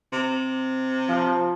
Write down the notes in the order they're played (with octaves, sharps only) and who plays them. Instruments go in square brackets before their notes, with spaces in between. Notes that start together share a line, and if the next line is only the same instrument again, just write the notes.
[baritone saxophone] C3
[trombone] F3